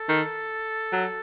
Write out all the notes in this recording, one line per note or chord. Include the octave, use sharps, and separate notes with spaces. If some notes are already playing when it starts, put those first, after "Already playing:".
Already playing: A4
D#3
F#3